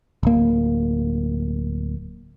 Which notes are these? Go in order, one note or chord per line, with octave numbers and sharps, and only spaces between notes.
D1 A#3